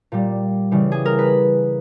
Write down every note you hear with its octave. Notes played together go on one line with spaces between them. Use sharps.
A#2 G3
C#3 E3 G3
G#4
A#4
B4